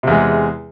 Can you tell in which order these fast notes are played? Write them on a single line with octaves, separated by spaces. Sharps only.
C3 E2 G#3